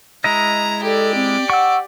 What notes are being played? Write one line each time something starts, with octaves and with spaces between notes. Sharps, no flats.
G#3 E4 D#5 A#5
G4 A4 D5
C4
F#5 C#6 E6